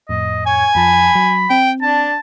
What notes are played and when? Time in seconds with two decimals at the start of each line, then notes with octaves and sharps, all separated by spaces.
0.09 F2 A2 D#5
0.47 C#5 G#5
0.75 F2 F3 A5 B5
1.15 F#3
1.50 C4 G5
1.82 D4 A5